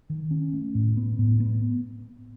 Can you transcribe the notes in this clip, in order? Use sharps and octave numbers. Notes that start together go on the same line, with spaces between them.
D#3
C#4
A3
A2
B3
A2
B3